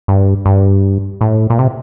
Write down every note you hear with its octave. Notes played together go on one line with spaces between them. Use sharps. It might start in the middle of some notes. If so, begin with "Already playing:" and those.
G2
G2
A2
A#2
C3